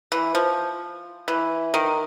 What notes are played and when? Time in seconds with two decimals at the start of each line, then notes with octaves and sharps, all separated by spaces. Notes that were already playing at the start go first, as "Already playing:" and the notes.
0.12 E3
0.35 F3
1.28 E3
1.74 D#3